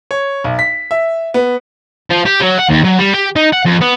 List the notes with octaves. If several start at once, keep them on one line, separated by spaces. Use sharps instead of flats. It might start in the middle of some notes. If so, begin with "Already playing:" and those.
C#5
B1
B6
E5
B3
F3
G4
F#3
F#5
D#2
F#3
G3
G4
D#4
F#5
F2
B3